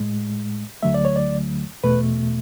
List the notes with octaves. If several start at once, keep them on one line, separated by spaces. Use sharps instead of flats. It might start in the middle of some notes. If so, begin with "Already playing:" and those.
Already playing: A2 G#3
D2 D3 F#3 A3 E5
D5
C#5
D5
E2 B2 A3 B4